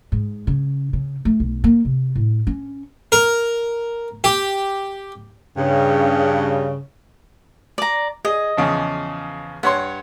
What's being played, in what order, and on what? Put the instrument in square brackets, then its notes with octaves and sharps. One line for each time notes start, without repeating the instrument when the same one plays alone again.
[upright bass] G#2
C#3
C#3
A3
B1
A#3
C3
A2
C#4
[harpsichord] A#4
G4
[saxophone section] G2 C#3
[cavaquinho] D5 A#5
[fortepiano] G#4 [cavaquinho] D#5
[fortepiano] E2 C#3 F3
[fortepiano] G2 C#5 C6 [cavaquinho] F#5